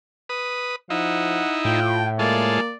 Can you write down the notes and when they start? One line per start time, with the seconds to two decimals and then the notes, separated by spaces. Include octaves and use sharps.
0.29 B4 D#6
0.90 F3 D#4 E4 F#5
1.65 A2 F4 G5
2.19 G#3 A#3 F4 A4 D5